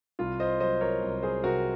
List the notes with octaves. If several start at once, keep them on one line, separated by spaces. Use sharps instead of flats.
C2 F4
C5 D#5
F#3 C5 D#5
A#4 C#5
C2
G#4 C5
C3 F#4 A#4